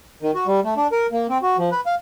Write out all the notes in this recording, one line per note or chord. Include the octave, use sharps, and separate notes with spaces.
D#3
F#4
G3
A3
D4
A#4
A#3
C4
F#4
F3
B4
F5